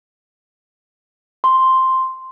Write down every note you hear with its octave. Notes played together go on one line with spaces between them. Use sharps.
C6